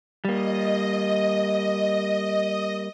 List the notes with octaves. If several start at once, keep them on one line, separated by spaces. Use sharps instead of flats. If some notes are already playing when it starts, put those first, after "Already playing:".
G3 A#3 D#5